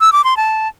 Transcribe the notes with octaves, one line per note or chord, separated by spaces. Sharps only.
E6
D6
C6
A5